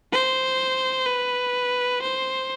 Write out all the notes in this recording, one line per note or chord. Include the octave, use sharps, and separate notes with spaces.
C5
B4
C5